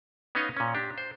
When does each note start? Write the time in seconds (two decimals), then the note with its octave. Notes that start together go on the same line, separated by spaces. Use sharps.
0.35 B3 C#4 D#4 C#5 D#5 F5
0.57 A#2 C#4
0.75 D4 G4
0.98 C5